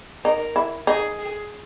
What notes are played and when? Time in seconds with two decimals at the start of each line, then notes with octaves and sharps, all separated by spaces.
0.25 D#4 A#4
0.56 E4
0.87 D#4 G#4
1.19 G#4